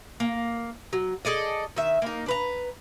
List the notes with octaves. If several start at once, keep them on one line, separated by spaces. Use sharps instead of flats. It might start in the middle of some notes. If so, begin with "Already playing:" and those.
A#3
F#3
G#4 A4 D5 D#5
D#3 E5
A#3 D#4
D4 B4 A#5